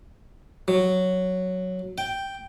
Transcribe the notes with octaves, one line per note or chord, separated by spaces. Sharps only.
F#3
G5